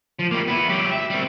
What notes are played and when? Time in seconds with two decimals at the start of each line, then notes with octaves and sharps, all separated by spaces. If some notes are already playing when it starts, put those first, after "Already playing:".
0.19 F3
0.31 G3 A#3
0.48 B3 E4
0.69 F#3 G4
0.91 E5
1.10 G3 C4